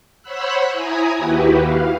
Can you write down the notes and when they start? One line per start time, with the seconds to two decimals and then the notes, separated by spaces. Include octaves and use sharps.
0.22 C5 C#5 F#5 B5 E6 F#6
0.73 E4 G#5 A#5 D#6
1.18 D#2 E4 F#4 G4 B4
1.60 F5